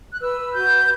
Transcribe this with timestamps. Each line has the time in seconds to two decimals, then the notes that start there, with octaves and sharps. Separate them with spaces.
0.12 F#6
0.20 B4 E6
0.54 F#4 G6